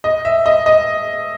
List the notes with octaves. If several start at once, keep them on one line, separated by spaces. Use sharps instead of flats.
D#5
E5
D#5
D#5